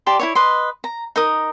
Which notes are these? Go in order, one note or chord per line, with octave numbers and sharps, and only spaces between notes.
G4 D5 A5 C6
E4 F4 C#5
B4 D#5 C6
A#5
D#4 A#4 D#6